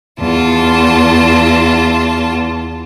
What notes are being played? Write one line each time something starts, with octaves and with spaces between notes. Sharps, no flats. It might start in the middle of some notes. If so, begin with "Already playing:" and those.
E2 F4 A5